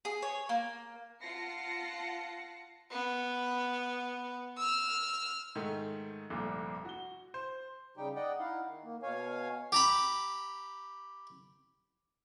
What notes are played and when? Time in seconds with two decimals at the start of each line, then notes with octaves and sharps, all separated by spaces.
0.05 G#4
0.22 C#5
0.49 A#3
1.22 F4 F#5 A5 A#6 C7 C#7
2.91 B3
4.57 E6 F6
5.55 G#2 D#3 A3
6.30 F1 G2 A#2 D3
6.85 F#4 G7
7.34 C5
7.97 C#3 G3 D#4 G4 G5
8.15 D5 D#5 F#5 G5
8.39 D#4 E4 F5 F#5
8.67 D#3
8.84 A#3
9.02 B2 C#5 F5 G#5
9.72 G4 A#5 B5